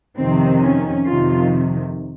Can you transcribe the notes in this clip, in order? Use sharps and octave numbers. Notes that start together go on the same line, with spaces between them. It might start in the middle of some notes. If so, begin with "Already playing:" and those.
F2 C3 D#3 C4
C#4
F2 C3 D#3 F4